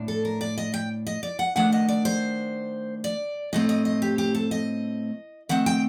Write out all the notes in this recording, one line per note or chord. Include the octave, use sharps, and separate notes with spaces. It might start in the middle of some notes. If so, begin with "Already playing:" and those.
Already playing: A2 D4
A4
A#4
D5
D#5
G5
D#5
D5
F#5
D#3 A3 D4 F#5
D#5
D5
C5
D5
A2 A3 C4 D#5
D#5
D#5
G4
G4
A4
D#5
D#3 A3 C4 F#5
G5